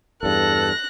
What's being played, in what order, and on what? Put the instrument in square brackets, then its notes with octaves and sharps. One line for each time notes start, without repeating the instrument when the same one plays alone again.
[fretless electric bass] E2 G2 [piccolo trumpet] A4 [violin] F#6 A#6